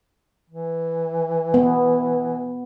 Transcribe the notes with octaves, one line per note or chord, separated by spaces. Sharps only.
E3
B3